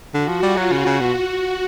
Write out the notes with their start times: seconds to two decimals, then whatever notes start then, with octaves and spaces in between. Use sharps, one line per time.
0.14 D3 F#4
0.28 F3
0.42 G3 F4
0.57 F#3
0.71 C#3 F#4
0.86 C#3
1.00 B2